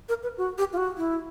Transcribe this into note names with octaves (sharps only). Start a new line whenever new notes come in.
A#4
B4
F#4
G4
F4
F#4
E4